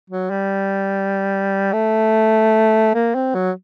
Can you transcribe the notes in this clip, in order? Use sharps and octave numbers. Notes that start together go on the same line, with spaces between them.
F#3
G3
A3
A#3
C4
F#3